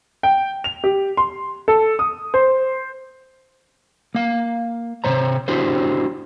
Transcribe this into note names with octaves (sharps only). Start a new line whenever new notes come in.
G5
F7
G4
C6
A4
D#6
C5
A#3 F5
C3 E3 C5 C#5 A#5
D4 E4 F#4 G4 C5